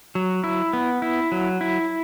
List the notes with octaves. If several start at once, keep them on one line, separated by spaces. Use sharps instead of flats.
F#3
E4
B3
E4
F#3
E4